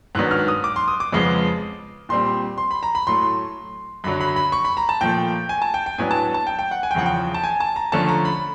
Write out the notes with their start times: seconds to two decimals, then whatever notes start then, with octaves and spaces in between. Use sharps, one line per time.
0.15 G#2 D#3 F#3 B3 D4 F#6
0.31 F6
0.48 D#6
0.64 D6
0.76 C6
0.88 D#6
1.00 D6
1.13 F2 C#3 F3 G#3 B3
2.09 A#2 G3 C4 C6
2.58 C6
2.71 B5
2.83 A#5
2.95 B5
3.07 A2 F#3 A3 C6
4.04 F#2 D3 F#3 B5
4.20 B5
4.36 B5
4.52 C#6
4.65 B5
4.77 A#5
4.89 A5
5.01 A#2 F3 A3 G5
5.49 G#5
5.62 A5
5.74 G5
5.86 G5
5.98 A2 F#3 B3 D4 G#5
6.11 A5
6.34 A5
6.47 G5
6.59 G5
6.71 F#5
6.83 G#5
6.91 G5
6.95 E2 C#3 F3 F#5
7.06 G5
7.34 A5
7.44 G#5
7.60 A5
7.76 A#5
7.92 D3 F3 A3 C#4 A5
8.08 A#5
8.25 B5